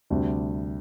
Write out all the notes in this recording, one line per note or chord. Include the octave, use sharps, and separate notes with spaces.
D2 C3 G3 D4